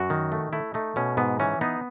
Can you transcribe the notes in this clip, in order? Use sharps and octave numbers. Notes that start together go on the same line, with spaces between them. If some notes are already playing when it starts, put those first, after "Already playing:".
Already playing: F#2 F#4
D#3
A3
A3 E4
A3 D#4
B2 C#4
G#2 B3
E3 C#4
B3 D#4